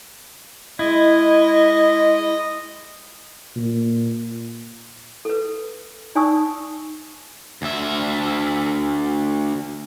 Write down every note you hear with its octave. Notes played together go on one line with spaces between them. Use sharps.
G#3 E4 D#5
A#2
A4 B4
D#4 D5 G#5 C#6 D#6 E6
D2 E5